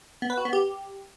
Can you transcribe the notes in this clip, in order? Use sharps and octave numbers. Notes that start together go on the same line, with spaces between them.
B3
B4
F#4
B3
G4